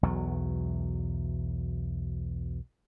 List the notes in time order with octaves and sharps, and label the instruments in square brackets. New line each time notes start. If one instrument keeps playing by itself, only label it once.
[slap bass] B1 E2 F#3